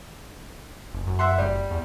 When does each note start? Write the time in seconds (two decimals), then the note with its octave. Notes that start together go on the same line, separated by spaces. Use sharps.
0.93 F#1
1.07 F#2
1.19 E5 F#5 C6
1.38 F#1 G3
1.71 E2